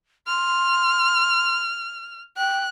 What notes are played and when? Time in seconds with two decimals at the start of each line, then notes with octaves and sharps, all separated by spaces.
0.27 C6 F6
2.37 G5 F#6